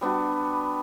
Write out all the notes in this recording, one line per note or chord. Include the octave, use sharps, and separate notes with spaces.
G3 B3 D4 F#4